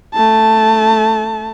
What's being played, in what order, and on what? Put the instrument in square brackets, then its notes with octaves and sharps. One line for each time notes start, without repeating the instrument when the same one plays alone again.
[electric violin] A3 A5